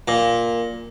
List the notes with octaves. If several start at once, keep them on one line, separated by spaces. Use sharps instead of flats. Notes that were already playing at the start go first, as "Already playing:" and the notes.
A#2